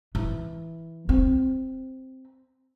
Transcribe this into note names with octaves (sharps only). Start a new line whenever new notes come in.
E3
C4